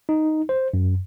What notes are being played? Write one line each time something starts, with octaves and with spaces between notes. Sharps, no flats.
D#4
C5
F#2